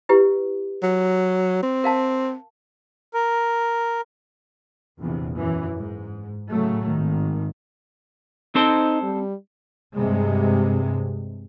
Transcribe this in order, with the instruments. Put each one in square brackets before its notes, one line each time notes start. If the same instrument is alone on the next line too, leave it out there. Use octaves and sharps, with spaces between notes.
[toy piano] E4 G4 B4
[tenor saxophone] F#3
C4
[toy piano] A#4 F5 A5
[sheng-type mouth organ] A#4
[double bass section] A#1 E2 C3
F#2 E3
G#2
A2 C#3 F#3 A3
G#1 D#3
[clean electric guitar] C4 A4 C5 [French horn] D#4
[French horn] G3
[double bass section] G2 C3 G#3